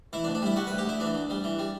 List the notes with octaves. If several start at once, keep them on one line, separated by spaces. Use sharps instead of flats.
E3 E4
D4
D2
D4
G3 E4
G3 F#4
D2 B4
G4
D2 E4
E3 D4
D2
G3
E3
G3